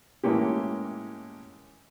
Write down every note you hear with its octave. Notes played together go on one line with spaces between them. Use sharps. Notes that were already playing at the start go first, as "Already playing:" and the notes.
A2 E3 G#3 A#3 C#4 G4